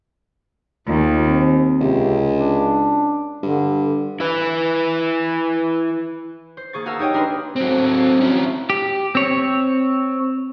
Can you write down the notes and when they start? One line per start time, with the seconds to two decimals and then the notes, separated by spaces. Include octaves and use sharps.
0.87 D#2 F4
1.26 C4
1.81 C#2 C3
2.40 D4
3.43 G2 D3
4.20 E4 B4
6.57 C5
6.73 A#3 G#4 C#6 A6
6.86 F#4 G#4 A#4 F5 A5 E6
6.99 D#4 G4 C#5 D#5 G5
7.14 D4 A#4 B4 B5 C6
7.56 F#3 C4
8.21 C#4 E4
8.70 G4
9.15 C4 C#5